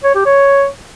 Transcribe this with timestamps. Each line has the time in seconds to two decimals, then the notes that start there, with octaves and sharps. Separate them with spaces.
0.04 C#5
0.15 G4
0.26 C#5